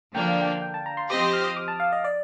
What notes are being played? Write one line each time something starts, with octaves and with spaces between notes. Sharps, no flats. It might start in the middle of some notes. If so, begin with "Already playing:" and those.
D3 F3 A#3 D4 G5
F5
G5
G5
A5
A#5
C6
F3 C4 G4 C5 D#5 D6
D#6
F6
D#6
D6
A5
F5
D#5
D5